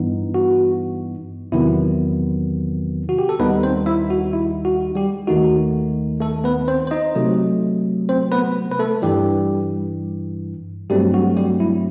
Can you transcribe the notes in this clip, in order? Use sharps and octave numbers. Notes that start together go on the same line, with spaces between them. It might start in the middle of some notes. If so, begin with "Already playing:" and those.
Already playing: G2 E3 B3 D#4
F#4
E2 C3 D#3 F#3 B3 E4
F#4
G4
A4
D#2 D#3 G3 B3 D#4 B4
C4 C5
E4 E5
F#4
E4
F#4
G3 G4
D#2 D#3 A3 D#4 F#4
A3 A4
B3 B4
C4 C5
C5
D#4 D#5
C3 F#3 A3
C4 C5
B3 B4
B4
A3 A4
G2 E3 G3 G4
G2 F#3 G3 A3 C4 G4
F#4
G3 G4
E4